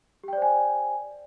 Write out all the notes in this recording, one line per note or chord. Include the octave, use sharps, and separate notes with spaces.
G4 C5 D5 G5 G#5